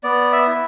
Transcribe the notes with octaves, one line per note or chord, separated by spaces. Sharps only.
B3 D5
E5
E4